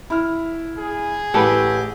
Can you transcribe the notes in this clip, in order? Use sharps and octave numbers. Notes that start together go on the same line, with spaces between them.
E4 F6
G#4
A1 G4 A4 B4